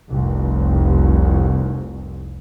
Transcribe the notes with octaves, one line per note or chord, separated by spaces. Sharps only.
F1 C2